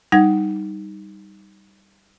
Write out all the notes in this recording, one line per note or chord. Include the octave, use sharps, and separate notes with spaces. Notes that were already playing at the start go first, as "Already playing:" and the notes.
G3 D#4 F#5 G#6